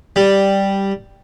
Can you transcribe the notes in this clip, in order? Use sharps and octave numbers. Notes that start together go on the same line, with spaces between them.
G3